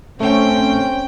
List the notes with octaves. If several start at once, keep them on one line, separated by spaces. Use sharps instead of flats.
A3 C4 C#4 G5